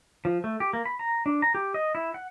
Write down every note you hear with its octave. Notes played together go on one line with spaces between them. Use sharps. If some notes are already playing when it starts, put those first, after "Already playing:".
F3
A3
G4
A#3
B5
A#5
D4
A#5
G4
D#5
E4
F#5